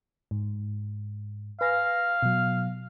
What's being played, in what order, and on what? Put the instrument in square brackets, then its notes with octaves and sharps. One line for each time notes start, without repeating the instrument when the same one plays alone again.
[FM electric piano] G#2
[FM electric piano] B4 G#5 A#6 [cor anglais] F5
[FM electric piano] B2 F#3